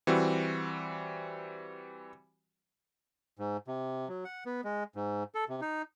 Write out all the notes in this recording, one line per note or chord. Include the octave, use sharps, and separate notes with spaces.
E3 G3 C4 F#4
G#2
C3
F#3
F#5
B3
G#3
G#2
A4
C3
D#4